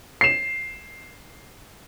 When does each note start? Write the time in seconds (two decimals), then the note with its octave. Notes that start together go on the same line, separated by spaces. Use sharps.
0.21 C7 E7